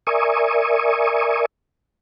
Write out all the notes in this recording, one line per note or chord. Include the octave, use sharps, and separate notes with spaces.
A#4 D5 E5 G#5 C#6 D#6